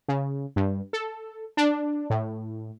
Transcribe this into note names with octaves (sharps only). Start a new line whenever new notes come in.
C#3
G2
A4
D4
A2